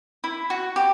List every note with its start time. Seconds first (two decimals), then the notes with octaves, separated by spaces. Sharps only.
0.24 E4
0.50 F#4
0.76 G4